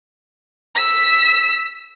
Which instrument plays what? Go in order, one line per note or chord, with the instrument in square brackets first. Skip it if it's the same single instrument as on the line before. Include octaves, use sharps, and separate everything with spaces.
[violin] E6 B6